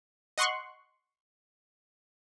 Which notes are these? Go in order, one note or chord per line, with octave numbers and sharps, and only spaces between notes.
D#5 F#5 C6 C#6 F#6